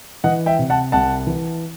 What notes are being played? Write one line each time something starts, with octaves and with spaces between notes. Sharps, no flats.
E3 D#5 F#5
E5 G5
C3
F#5 A5
C2 F#5 A5
E3